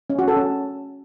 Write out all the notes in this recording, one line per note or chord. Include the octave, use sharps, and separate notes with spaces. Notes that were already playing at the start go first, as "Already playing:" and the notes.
C#4
F#4
A4
C#4